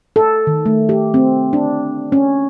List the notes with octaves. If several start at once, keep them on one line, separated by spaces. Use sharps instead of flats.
A4
D#3
A3
G4
C4
D4
C#4